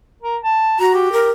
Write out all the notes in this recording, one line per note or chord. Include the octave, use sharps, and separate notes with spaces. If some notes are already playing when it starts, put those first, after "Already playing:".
A#4
A5
F#4 A#5
G4
A#4